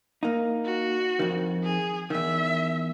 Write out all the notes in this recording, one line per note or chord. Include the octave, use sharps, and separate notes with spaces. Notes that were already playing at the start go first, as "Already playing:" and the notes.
A#3 D#4
F#4
F2 D#3
G#4
E2 D#3 E5